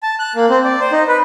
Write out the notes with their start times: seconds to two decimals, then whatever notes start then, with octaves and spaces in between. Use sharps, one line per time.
0.03 A5
0.19 F#6
0.35 A#3
0.50 C4
0.65 D5
0.80 C5
0.92 D#4
1.08 B4